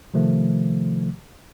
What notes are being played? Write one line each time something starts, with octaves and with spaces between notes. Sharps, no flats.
C3 D#3 F3 A3